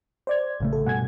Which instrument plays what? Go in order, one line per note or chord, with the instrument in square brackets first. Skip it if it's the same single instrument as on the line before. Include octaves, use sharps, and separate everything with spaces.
[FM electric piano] C5 D5 G#6
[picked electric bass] A1 C#3 A3
[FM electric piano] A4
[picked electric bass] G2 B2 [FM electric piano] F#5 G#5 G#6